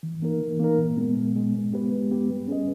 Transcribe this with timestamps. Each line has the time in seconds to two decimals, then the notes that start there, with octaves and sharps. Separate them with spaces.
0.03 E3
0.22 A#3 D#4 A#4
0.41 E3
0.60 A#3 D#4 A#4
0.78 A#2
0.98 G#3 B3
1.17 A#2
1.36 G#3 B3
1.54 G#3
1.73 B3 G4 B4
1.92 G#3
2.11 B3 G4 B4
2.29 G3
2.48 C#4 G#4 B4 D#5